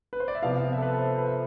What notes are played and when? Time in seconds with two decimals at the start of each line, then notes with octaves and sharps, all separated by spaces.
0.13 B4
0.20 C5
0.28 D5
0.35 E5
0.42 C3 F3 B3 F4 F5
0.58 F5
0.73 E5
0.78 A4
0.82 B4
0.93 A4
0.99 C5
1.03 B4
1.18 B4
1.26 E5